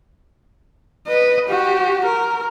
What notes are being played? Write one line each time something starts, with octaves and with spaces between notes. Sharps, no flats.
B4 D#5
F#4 G4
A#4